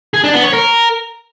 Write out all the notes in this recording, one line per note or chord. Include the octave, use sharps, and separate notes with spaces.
G#4
D4
B3
C#5
A#4